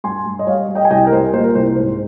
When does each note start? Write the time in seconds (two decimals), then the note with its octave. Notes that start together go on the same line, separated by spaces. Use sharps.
0.04 G2 G#5 C6
0.26 G2
0.39 D#5
0.47 G3 C#5 F5
0.69 G3
0.75 D#5 G5
0.85 G#5
0.90 C2 D#5 G5
1.07 A#4
1.12 G3 C5
1.33 A#2 C5
1.44 A#4
1.55 C2 C5
1.76 G#2 C5